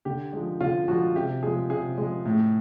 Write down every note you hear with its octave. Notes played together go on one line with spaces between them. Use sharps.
D3 G4
F3 G#3
D3 F4
F3 G#3 F#4
C3 G4
F3 G#3 G#4
C3 G#4
F3 G#3
A2